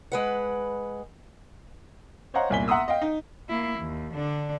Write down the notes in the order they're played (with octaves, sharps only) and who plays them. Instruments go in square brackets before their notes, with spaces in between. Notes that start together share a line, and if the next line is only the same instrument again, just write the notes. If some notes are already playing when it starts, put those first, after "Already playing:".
[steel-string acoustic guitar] G#3 B4 F#5
[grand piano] C5 C#5 D#5 F5 F#5 A#5
E1 C2 A#2 G#5 B6 G7
E5 F#5 A#5 C6 D#6 E6
D#5 F5 G5
D#4
[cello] A#3 E4
D#2
D3 D4